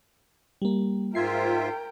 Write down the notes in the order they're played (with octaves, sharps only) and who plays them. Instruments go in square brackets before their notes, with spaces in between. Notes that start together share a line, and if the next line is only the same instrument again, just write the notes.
[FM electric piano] G3 A#3
[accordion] G#2 F4 E5 [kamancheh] A#4 G5 [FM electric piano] G#6 C7